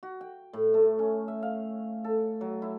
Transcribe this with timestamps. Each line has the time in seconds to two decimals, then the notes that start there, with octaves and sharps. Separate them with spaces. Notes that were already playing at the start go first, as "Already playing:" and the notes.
0.03 F#4
0.21 G5
0.53 A2
0.74 A3
0.99 C#4
1.28 E5
1.43 F5
2.04 A4
2.41 F#3
2.62 E4